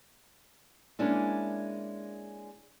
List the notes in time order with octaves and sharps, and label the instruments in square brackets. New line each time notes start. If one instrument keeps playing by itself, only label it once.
[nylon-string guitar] G#3 A#3 C#4 D4 E4